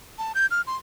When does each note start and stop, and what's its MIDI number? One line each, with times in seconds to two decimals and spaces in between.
0.18 0.33 81
0.35 0.46 91
0.51 0.62 89
0.67 0.77 84